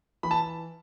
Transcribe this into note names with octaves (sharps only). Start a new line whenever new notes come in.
E3 B5
A5